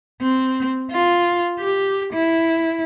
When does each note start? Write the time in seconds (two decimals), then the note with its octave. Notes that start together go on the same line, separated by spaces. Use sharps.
0.22 C4
0.91 F4
1.59 G4
2.13 E4